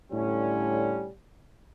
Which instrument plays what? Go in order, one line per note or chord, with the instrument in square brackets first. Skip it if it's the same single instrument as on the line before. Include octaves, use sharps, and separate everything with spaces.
[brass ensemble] A2 D3 G3 C#4